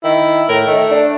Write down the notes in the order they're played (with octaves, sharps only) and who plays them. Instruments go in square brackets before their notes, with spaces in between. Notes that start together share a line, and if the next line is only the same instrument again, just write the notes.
[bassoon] D#3 [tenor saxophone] E4
[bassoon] A2 [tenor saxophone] A#4
[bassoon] D#3 [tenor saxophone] A3
[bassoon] D4